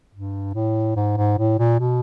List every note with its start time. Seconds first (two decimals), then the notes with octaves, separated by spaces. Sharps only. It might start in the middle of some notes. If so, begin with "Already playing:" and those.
0.13 G2
0.54 A2
0.96 G#2
1.17 G#2
1.39 A2
1.59 A#2
1.80 B2